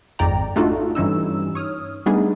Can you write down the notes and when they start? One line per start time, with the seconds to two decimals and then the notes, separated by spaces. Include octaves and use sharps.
0.19 G#1 F2 G#2 D5 G5 A#5
0.56 A3 D4 D#4 F4 F#4 A4
0.95 G2 E3 C#4 D#4 E6
1.55 C#5 D#6 F6
2.06 G3 A3 B3 D4 D#4 G#4